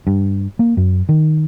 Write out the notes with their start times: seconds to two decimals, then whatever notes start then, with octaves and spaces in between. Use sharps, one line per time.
0.07 G2
0.59 A#3
0.77 F#2
1.09 D#3